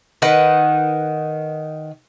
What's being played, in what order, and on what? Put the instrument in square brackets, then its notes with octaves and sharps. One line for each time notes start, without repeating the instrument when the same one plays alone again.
[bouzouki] D#3 B4 D#5 F#5